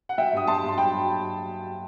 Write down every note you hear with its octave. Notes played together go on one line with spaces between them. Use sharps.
F#5
F#3 E5 G5
G2 D#6
F#3 A5 C6
G2
C6
F#3 G5 B5
G2